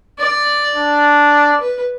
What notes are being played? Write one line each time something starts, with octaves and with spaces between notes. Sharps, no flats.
D5
D4
D5
B4